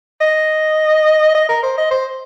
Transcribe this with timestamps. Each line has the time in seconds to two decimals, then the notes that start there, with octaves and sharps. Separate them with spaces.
0.21 D#5
1.34 D#5
1.49 A#4
1.63 C5
1.78 D#5
1.91 C5